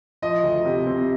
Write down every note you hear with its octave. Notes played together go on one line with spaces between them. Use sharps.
F3 D#5
D2
C3
C4